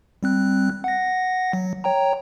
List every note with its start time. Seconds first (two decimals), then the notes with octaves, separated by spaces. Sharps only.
0.23 G3 C4 F#6
0.84 F#5 A#6
1.53 F#3
1.84 C#5 G5 A#5